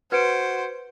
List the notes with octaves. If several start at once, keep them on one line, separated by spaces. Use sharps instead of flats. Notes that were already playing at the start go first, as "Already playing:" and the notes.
F#4 B4 C5 G#6 C#7 D7